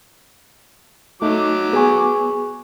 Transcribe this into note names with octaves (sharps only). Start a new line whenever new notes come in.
F#3 A3 D#4 D6
B3 G#4 G#5 C#6